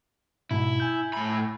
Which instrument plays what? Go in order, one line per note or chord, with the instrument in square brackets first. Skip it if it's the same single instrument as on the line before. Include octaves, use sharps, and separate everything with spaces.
[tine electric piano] G#2 B2 [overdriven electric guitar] E4
[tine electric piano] G#5 G6
[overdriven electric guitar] A2 B5